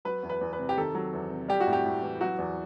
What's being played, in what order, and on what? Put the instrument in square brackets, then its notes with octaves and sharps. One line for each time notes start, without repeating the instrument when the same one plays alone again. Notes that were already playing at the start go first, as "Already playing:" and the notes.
[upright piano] F#3 B4
E2
B4
E2
B4
C3
G4
D#3 A4
F#3
E2
C3
G3 G4
F#4
A2
G4
A2
E3
F#3 F#4
E2